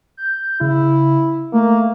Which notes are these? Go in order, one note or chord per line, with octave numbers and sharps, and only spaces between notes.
G6
C#3 E4
A3 A#3